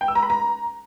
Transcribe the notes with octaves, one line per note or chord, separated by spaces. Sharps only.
G5
E6
A#5
B5
A#5